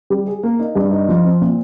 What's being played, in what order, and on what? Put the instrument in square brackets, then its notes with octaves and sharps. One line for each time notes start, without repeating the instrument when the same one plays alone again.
[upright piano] G3
G#4
A#3
D#4
G2
D#4
F3
C4
A#2